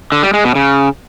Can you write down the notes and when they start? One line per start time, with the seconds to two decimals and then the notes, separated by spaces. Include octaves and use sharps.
0.12 D3
0.23 G3
0.34 G#3
0.44 B2
0.55 C#3